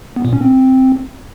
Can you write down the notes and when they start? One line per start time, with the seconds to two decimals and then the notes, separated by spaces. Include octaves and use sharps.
0.16 B3
0.25 A#2
0.33 C#4
0.41 C4